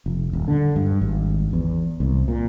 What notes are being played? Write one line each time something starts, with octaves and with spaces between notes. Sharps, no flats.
F1
D#1
D3
G2
G#1
E2
C2
A#2